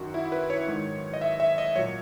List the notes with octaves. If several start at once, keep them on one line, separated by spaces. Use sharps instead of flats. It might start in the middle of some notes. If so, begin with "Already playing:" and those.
Already playing: F#2 D#3 F#3 F#4
E4
B4
C#5
G#2 D#3 G#3
D#5
E5
E5
D#5
A#2 F#3 C#5